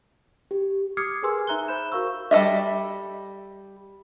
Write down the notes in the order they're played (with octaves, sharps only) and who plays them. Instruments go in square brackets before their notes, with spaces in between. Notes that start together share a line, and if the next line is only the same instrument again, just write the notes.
[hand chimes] G4
[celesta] D6 D#6 F6 G#6 C7 C#7
G#4 A#4 B4 G#5 C6 E6
D#4 E5 A#5 F#6 G7
C5 B5 G6 E7
F#4 A#4 F5 C#6 E6
[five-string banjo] G3 A4 D#5 E5